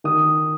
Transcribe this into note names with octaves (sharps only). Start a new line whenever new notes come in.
D#3 D#6